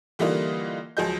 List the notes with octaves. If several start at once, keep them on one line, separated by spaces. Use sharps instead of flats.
D3 E3 G3 A#3 D#4 F4
C#2 F3 F#3 G#4 D#5 G6